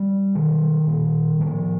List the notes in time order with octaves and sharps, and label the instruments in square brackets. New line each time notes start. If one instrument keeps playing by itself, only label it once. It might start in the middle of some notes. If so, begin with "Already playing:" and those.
Already playing: [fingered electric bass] G3
B2 D#3
A#2
A2 F3